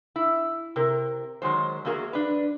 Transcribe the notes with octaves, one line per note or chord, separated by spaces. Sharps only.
E4
C3 A#4
D#3 F#3 G#3 C5
E2 A#3 F#4 G#4 A#4
D4 B4